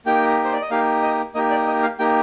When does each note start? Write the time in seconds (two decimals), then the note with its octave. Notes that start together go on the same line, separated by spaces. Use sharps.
0.06 A#3 D#4 G4 G5
0.44 C5
0.53 D5
0.62 D#5
0.70 A#3 D#4 G4 F5
1.03 D#5
1.35 A#3 D#4 G4 D#5
1.50 D5
1.67 D#5
1.83 F5
1.99 A#3 D#4 G4 G5